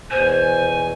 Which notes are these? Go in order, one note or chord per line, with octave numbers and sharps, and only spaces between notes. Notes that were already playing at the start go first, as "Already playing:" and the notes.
E2 B2 C5 G#5